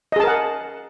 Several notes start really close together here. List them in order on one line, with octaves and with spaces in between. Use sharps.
D#5 G#4 A5 A#4 F#5